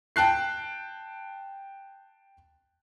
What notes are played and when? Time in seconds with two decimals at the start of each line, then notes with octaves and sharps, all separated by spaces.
0.16 G5 A5 F#6 C7